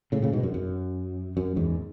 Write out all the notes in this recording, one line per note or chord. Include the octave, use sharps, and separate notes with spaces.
A2 C#3
A2 C#3
G#2 B2
F#2
F#2
F#2
E2 G#2